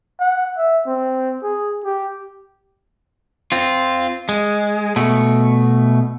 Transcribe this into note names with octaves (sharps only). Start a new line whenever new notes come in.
F#5
E5
C4
G#4
G4
C4 F4
G#3
B2 A3